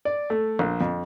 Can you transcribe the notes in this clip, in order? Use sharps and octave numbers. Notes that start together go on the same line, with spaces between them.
D5
A3
A#1
F2